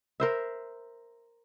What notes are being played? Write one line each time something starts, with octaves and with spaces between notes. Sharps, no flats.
A#4 C5 E5